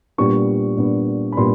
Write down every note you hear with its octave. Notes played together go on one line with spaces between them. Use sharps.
A#2 G3 B3 D4 C#6
A#2 G3 B3 D4
B5
A#2 G3 B3 D4 C6